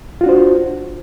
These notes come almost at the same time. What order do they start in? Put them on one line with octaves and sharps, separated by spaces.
F4 F#4 D4 C5